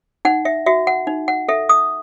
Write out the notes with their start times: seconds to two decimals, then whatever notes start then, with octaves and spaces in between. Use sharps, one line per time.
0.25 D#4 F#5
0.45 E5
0.66 F#4 E5
0.87 F#5
1.07 D#4
1.28 F#5
1.48 A4 E5
1.69 D#6